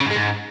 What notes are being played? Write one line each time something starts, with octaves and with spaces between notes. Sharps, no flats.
C#3
G#2
G#3
G#2